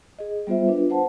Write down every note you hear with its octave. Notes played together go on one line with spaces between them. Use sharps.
G#4 D#5
G3 B3 F4 C5 E5
D4 F4 B4
C5 F#5 A5